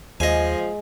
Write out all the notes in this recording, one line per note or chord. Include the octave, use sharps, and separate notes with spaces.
D#2 F3 G#3 D#5 G#5